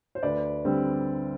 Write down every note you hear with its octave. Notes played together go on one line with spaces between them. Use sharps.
C5
D2 B4 D5
D3 G3 C4